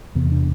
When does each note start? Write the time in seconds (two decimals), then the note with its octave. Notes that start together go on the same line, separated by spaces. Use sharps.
0.15 E2 C3 B3
0.32 D4